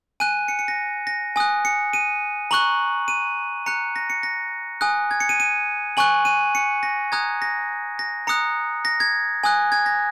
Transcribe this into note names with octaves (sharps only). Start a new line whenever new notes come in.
G#5 F#6 D#7
C#7
C#7
A#6
A#6
G#5 D#6 F#6
C#7
D#7
A#5 C#6 F#6 F#7
D#7
A#5 F#6 C#7
A#6
C#7
A#6
G#5 D#6 F#6
G#6
C#7
D#7
D#7
G#5 C#6 F#6 F#7
D#7
C#7
A#6
A#5 D#6 F#6 G#6
A#6
A#6
A#5 D#6 F#6 C#7
A#6
G#6
G#5 D#6 F#6
G#6
A#6